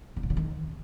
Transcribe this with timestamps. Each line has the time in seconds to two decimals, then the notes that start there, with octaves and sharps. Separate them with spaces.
0.17 D3
0.23 B2
0.30 C#3
0.37 D#3